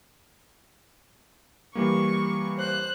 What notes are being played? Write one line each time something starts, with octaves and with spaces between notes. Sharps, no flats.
E3 G3 A#3 C#6
C5 F#6